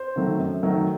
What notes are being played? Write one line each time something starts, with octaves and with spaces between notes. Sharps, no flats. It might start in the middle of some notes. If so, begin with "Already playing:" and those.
Already playing: C5
D#3 F#3 A3
F#2
D#3 F#3 A3